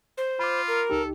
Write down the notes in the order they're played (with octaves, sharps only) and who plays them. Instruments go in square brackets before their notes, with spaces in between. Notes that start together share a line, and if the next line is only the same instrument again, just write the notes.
[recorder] C5
[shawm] F4 [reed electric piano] B5 D6
[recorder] A#4
[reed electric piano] C#2 D#4 G4 [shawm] A4